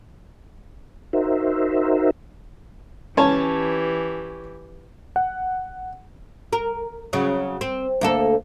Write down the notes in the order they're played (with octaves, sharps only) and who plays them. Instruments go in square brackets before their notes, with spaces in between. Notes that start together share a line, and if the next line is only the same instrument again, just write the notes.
[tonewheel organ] D#4 F#4 A#4 C5 E5
[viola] E3 G4 [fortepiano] C#4 C#5 A5
[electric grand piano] F#5
[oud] A#4
C#3 F#3
C4
D2 A#3 A4